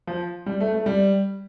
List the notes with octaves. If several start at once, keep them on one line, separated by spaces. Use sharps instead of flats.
F3
G3
A3
A3
G3